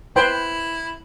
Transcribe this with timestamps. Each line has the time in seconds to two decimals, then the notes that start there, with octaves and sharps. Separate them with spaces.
0.16 E4 B4 C5 G5